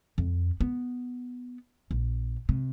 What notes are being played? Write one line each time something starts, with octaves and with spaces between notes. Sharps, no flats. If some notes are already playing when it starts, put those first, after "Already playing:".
F2
B3
A#1
C3